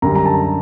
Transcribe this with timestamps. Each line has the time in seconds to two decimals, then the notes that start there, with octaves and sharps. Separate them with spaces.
0.02 F#2 D3 G3 A#5
0.15 A#5
0.26 A5